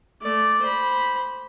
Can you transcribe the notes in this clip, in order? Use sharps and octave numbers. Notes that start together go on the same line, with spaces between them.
A3 D5
C5 B5